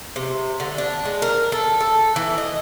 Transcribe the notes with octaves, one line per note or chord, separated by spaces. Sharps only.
C3
D3
D4
G#3
A#4
A4
A4
E3
D#5